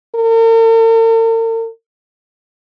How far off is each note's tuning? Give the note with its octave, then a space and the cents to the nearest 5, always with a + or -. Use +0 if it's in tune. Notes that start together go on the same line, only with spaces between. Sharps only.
A#4 -45